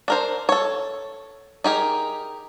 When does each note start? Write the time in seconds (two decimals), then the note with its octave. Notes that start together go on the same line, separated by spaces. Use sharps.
0.08 D4 A#4 C5
0.49 A4 C#5
1.64 D#4 G4 G#4 A#4